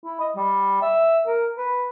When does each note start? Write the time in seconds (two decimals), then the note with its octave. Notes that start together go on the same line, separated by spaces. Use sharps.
0.05 E4
0.20 D#5
0.36 G3
0.82 E5
1.26 A#4
1.57 B4